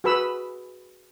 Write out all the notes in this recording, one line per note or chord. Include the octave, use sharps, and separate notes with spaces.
F#4 G#4 B4 B5 E6